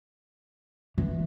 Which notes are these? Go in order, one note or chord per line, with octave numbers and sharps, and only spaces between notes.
E3